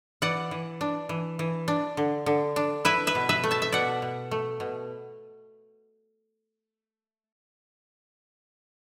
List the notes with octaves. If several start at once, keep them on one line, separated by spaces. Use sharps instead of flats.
E3 D5 F#5
E3
D4
E3
E3
D4
D3
D3
D4
E4 B4 E5
B4 E5
B2
B4 E5
A3
E5 A5
E5
B2 D5 F#5
B2
A3
B2